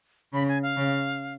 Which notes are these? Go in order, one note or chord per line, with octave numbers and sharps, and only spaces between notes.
C#3 B5
G#5
F5
C#3